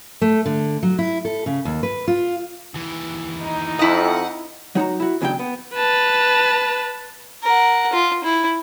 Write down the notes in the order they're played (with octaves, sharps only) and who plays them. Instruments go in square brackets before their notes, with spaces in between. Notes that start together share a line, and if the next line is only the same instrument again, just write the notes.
[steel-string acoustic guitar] A3
D3
F#3
E4
A4
C#3
D#2
B4
F4
[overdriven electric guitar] D#2 E3
[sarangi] D#4
[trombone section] F2 [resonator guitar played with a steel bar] E4 D#5 [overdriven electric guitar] F#5
[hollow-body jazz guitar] F#3 D#4 F#4 A#5
E4 F#4
D#2 C#3 F#3 D4 G5
B3
[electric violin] B4 A5
[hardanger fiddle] A#4 F#5
F4
E4